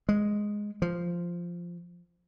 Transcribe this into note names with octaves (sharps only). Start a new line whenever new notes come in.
G#3
F3